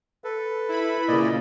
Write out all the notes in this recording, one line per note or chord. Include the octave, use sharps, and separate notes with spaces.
A4 B4
E4 B5
A#2 C#3 D5 D#5